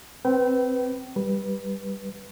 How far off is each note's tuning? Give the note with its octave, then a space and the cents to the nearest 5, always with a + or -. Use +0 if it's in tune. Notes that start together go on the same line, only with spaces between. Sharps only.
C4 +0 B4 +0 G5 -35
G3 +0 B4 -15